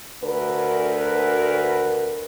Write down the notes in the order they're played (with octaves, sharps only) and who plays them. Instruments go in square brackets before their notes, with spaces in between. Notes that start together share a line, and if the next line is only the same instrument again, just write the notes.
[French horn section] D2 A#4 B4